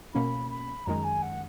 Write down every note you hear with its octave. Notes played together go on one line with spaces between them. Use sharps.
B2 A#3 C#4 B5
B5
F#2 D#3 G#3 A#5
G#5
F#5